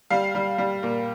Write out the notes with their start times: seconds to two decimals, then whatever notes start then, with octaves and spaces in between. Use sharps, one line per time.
0.11 G3 F5
0.35 G3
0.58 G3
0.83 A#2